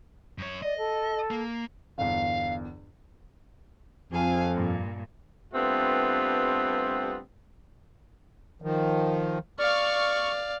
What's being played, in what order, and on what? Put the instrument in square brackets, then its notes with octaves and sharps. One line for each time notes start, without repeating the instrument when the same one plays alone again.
[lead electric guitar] F#2 C#5
[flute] D5 [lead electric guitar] D#5
[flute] A4
[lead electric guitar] A#3
[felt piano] G1 E2 [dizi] F5
[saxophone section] F2 [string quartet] G#4 F5 G#5
[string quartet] G2 A#2
[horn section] G2 G3 A3 B3 C4 F4
[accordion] D#3 F3
[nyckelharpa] D5 F5 [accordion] C#6 F6